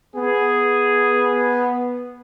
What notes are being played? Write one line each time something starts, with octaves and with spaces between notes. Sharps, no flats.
B3 G#4